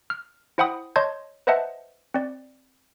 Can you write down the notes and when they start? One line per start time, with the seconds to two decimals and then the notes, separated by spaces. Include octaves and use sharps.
0.10 F6
0.58 E4 C5 F#5 G5 B5 D#6
0.96 C#5 D#5 A5 C6 G6 G#6
1.47 B4 C5 D#5 E5 F#5 A5
2.14 C4 D5